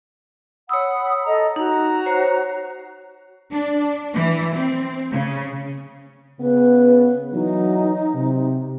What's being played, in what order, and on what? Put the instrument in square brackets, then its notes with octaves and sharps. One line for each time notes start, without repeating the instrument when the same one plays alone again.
[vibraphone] C#5 E6 [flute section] F#5 B5 D#6
[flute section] A4 D#5 A#5
[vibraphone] D#4 [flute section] F#4 A#5
[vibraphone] C5 C#5
[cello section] D4
E3
C4
C#3
[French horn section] C#3 B3 [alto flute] B4
[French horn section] E3 F#3 [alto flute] D#4
[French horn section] C3